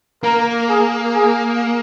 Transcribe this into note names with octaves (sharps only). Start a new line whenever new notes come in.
A#3 A#4
G#4
G#4